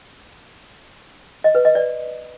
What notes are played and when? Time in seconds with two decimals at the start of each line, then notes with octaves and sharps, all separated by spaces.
1.44 D#5
1.55 B4
1.65 D#5
1.75 D5